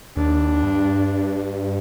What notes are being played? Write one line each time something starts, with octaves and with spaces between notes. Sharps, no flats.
D#2 D4
G2